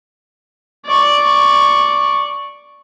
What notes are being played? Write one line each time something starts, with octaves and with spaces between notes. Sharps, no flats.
D5 C#6